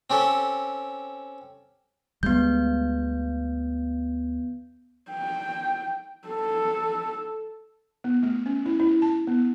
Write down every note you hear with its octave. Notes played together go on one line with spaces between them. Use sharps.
C4 C#4 G4 A4
D2 G3 G#3 B3 G6
G5
A4
B3
A3
C#4
E4
E4
A5
B3